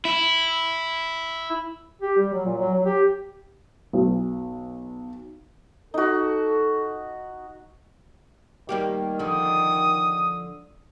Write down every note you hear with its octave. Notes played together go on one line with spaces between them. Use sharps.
E4
G4
G3
F#3
A#2
F#3
F#3
G4
B1
D#4 F#4 A4
D#3 G3 A#3 G4
D3 F3 D#6